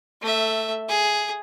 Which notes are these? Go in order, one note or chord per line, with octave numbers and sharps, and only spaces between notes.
A3 E5
G#4